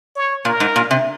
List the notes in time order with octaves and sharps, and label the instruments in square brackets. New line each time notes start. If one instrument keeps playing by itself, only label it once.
[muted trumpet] C#5
[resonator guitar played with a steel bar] A#2 [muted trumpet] A#4
[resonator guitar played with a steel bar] G#2
A#2
C3